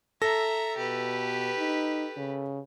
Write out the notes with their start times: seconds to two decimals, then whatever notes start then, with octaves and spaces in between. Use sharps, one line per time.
0.22 A4 E5 A#5 A#6
0.77 B2 G4 B4
1.57 D#4
2.17 C#3